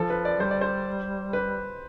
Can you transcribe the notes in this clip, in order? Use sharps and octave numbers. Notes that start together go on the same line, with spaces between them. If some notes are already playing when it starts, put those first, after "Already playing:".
Already playing: F3 A4
B4
D5
G3 C5
D5
C5
B4